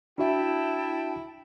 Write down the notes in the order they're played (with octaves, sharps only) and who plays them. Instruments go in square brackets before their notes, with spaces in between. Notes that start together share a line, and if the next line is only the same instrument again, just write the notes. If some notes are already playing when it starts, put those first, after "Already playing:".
[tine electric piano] D4 F#4 E5 [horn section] E4 [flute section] G5 A5